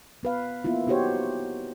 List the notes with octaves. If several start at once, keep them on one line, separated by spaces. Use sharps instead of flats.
B3 B4 F5
A#3 B3 E4 F4
B3 D#4 F#4 G4 C5 C#5